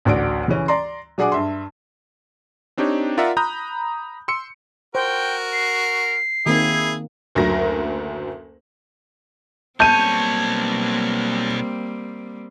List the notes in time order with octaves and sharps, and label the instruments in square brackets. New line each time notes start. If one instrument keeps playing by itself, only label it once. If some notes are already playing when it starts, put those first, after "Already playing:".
[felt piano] A1 D2 D4 F#4 D7
C#3 E3 C#4
D5 A#5 C6
F#3 D4 G#4 F#5 G#5 D6
G2 E5 C6
[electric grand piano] C4 D4 D#4 G4 C#5
F4 A#4 D5 E5 F#5
A#5 B5 D#6 F#6 G6
C6 E6 C#7
[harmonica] F#4 A#4 [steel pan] C5 [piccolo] G5
[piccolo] C7
[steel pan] D#3 A#3 C4 [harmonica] E4 G#4
[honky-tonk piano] F#1 D2 F#3 A#4 A#6
[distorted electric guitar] B1 C#5 [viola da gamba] G3 A#3 C4 [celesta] A5 [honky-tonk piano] G6 D#7